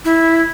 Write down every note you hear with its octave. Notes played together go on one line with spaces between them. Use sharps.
E4